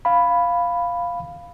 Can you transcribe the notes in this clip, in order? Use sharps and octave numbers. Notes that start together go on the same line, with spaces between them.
F5 B5